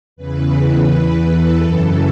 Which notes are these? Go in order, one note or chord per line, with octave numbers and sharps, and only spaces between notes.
E2 C#3 E3 B4
B4
E2 E3
A4
F#2 C#3 E3 A4